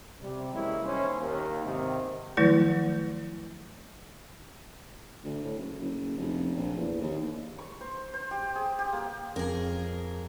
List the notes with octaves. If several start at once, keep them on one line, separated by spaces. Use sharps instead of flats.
C3 G3
E3 G3 G#3 A#3 C#4 E4
D#2 C#4 C5
D#2
G#2 C3 D#3
D#3 F3 F#3 A3 E4 B4
D2
A2
F#1
F#1
F1
A#1
E2
D#2
C#6
C5
C5
G4
G#4
G4
A#3
F2 G#4 A#4